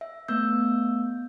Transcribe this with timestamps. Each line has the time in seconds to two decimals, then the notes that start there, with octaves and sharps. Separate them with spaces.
0.01 E5
0.28 A3 B3 E6 G6